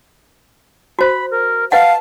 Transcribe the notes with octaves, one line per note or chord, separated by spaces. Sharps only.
F#4 C5 B5
A#4
B4 D#5 F5 F#5 A5